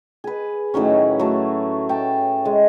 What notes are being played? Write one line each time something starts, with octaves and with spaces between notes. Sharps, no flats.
G#4 B4
A2 D#3 F#3 C#4
F#3 A3
G5 A5
G#3